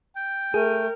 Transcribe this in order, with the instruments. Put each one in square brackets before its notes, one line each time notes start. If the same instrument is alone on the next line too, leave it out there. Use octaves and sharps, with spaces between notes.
[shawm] G5
[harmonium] A3 [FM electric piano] G#4 [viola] A#4